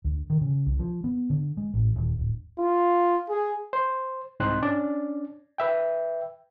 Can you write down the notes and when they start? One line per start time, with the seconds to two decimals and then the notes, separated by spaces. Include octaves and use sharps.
0.05 D2
0.30 D#3
0.41 C#3
0.66 C2
0.79 F3
1.04 B3
1.30 D3
1.57 G#3
1.74 A1
1.96 D#1
2.19 D1
2.58 F4
3.29 G#4
3.73 C5
4.40 C2 G#2 C4 D#4 C5 F#6
4.62 C#4 D4 D5
5.58 B4 E5 G5